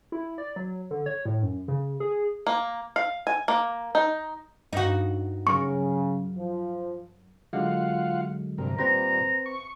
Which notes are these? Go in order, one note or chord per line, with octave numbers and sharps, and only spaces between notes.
E4
D5
F#3
D3
C#5
A2
F#2
C#3
G#4
A#3
F5
G#5
A#3
D#4
G2 D#4 F#4
C#3 F#3 A#4 C#6
F3
D3 F#3 G#3 F4 F5 F#5
G2 C3 A#4
A#2 G3 C4 B4 C5 A#5
C#6